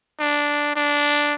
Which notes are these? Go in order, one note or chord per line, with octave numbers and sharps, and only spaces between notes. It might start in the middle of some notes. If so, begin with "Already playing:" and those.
D4
D4